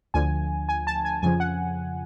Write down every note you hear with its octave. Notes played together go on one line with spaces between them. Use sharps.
D2 D3 F3 G#5
G#5
A5
G#5
F2 C#3 F3 G#5
F#5